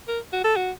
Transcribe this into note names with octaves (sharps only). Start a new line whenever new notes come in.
A#4
F#4
A4
F#4